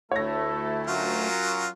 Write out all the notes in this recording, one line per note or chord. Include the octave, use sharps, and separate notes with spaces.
D2 A3 E4 A4 C#5 A#6
F#3 C#4 F4 F#4 A#4